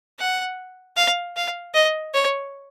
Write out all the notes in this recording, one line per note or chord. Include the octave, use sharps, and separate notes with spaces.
F#5
F5
F5
D#5
C#5